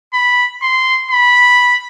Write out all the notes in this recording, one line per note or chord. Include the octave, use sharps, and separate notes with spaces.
B5
C6
B5